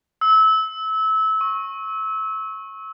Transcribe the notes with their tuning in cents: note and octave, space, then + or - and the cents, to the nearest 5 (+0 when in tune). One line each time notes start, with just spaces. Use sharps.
E6 -25
C#6 -20